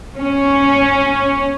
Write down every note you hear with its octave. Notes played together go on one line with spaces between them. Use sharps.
C#4